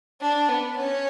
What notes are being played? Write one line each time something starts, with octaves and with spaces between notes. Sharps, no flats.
D4
B3
C#4